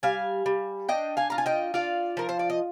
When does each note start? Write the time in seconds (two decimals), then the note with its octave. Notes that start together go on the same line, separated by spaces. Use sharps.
0.03 G3 F5 G#5
0.46 G3
0.89 D4 D#5 G5
1.17 F5 G#5
1.30 F4 A#5
1.38 G#5
1.46 D#5 G5
1.74 F4 D5 F5
2.17 F3 A#4
2.29 C5
2.39 D5
2.50 D#5